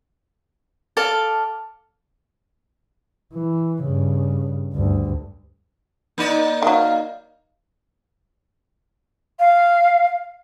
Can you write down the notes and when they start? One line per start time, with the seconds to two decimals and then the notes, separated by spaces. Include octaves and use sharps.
0.97 A4 D5 F5 A5
3.33 E3
3.82 G2 C#3
4.73 D2 G2
6.18 A#3 D#4 D5
6.62 D#3 F#3 F5
9.40 F5